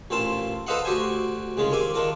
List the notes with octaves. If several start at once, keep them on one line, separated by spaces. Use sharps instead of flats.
A1 A#2 C4 F4 A5
A4 B4 C5 D#5 F5 F#5
D2 F#4 G4 C5 G#5
C2 C#3 G#3 F4
D#2 A#3 C4 G#5 D6
D#3 D4 F4 A#4